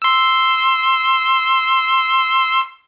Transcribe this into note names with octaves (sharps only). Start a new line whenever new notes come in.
C6 E6